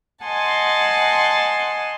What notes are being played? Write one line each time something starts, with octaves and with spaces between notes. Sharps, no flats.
D#5 F#5 G#5 A5 C6